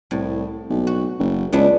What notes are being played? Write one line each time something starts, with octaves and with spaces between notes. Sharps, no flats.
C2 A2
B1
F#4
F#1
C#2 B3 D4